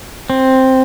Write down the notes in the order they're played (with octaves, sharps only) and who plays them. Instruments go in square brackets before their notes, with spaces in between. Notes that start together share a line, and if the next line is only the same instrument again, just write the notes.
[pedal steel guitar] C4